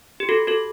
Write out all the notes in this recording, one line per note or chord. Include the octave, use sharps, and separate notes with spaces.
G4
F#4 A4
F#4 A4